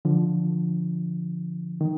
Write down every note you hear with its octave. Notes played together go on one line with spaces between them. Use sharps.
D3 F3
D#3